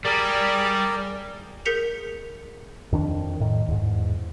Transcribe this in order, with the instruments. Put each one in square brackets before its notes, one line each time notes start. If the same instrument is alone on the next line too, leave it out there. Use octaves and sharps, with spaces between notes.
[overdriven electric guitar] G3 [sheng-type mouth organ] G#4 A#4 D5
[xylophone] G#4 A#4 G6 B6 C#7 F7
[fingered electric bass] F2 D#3 D4
A2 D#3
E2 G#2